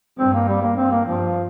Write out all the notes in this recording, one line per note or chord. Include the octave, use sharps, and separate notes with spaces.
G2 C4
A#3
G3
A#3
G2 C4
A#3
G2 F3